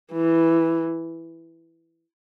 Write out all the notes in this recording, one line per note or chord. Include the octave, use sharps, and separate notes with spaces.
E3